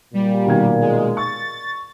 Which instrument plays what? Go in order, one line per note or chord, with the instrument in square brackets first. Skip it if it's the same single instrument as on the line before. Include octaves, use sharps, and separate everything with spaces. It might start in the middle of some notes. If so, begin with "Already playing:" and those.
[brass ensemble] A#2 [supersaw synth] G3
[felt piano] B2 D#3 G#6
[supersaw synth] G#3
[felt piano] C#6 [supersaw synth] A6